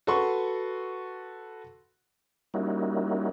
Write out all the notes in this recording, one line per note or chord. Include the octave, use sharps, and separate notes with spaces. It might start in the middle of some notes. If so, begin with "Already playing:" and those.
F#4 A4 B4 C6 C#6
G3 A#3 C#4 D#4 E4 F#4